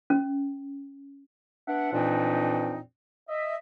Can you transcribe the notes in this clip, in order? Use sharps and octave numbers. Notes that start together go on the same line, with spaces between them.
C#4
B3 D4 E5 F#5
F2 A#2 E3 C4 D4 D#4
D#5 E5